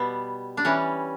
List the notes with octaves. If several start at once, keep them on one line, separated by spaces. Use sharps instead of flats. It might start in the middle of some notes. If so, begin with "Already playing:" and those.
Already playing: B2 G3 B3
D4
E3 G3 C#4